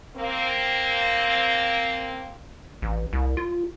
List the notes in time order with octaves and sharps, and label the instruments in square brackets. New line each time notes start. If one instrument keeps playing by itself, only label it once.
[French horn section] A#3 C4
[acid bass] A1
C2
F4